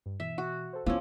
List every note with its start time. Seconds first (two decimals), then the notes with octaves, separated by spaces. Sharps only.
0.06 G2
0.20 B2 E3 E5
0.38 F#4
0.73 A4 C5
0.86 F3 B3 C#4 E4 D6 E6 G#6